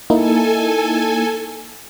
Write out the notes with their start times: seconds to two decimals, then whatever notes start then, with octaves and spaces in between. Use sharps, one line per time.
0.10 A#3 D#4 E4 A4 G#5